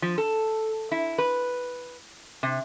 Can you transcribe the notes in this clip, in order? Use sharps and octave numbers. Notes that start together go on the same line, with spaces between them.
F3
A4
E4
B4
C3